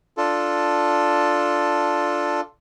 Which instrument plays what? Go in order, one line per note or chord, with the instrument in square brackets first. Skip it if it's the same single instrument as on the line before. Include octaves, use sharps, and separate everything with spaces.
[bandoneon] D4 F4 A4